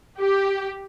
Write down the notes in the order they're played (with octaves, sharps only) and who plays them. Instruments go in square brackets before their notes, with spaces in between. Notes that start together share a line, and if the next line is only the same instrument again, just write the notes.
[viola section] G4